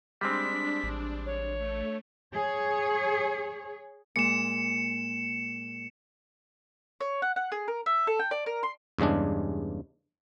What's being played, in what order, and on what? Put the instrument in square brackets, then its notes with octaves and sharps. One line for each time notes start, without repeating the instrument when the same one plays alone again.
[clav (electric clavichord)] G3 G#3 C4 [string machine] D4 [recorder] B6
[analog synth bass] A1
[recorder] C#5
[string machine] A3
[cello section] G#4 C#5
[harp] A#2 G#3 [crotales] C#7 E7
[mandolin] C#5
F#5
F#5
G#4
A#4
E5
A4
G5
D5
A#4
C6
[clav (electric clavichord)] E2 G2 C#3 G#3 D4